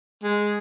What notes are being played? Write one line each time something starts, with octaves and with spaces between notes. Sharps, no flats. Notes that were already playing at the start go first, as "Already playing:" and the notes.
G#3